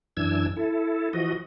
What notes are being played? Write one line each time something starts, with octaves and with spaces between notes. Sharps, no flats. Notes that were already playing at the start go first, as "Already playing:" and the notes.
F#2 E3 D4 E6 G#6
E4 A4
E3 F3 F#4 D#5